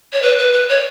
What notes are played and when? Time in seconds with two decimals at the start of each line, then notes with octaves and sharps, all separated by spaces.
0.13 C#5
0.22 B4
0.38 B4
0.53 B4
0.69 C#5